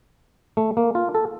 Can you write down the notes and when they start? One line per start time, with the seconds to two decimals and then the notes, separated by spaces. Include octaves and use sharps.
0.57 A3
0.77 A#3
0.95 F4
1.15 A4